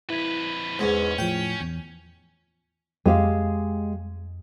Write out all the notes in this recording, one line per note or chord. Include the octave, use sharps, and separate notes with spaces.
F2 E4 B4 G#6 B6
E2 G#2 C#4
A2 F3 G5
E2
F2 G#3 G4 F5